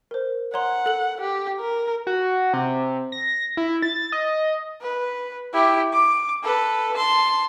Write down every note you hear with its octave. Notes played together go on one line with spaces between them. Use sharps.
A#4 C5
C#5 F#5 A#5 C6
A4 F#7
G4
A#4
F#4
C3
A#6
E4
A6
D#5
B4
E4 G4
D6
A4 B4
A5 C6